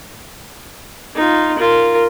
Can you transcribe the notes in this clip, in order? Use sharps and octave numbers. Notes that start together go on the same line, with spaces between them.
D#4 F4
F4 A#4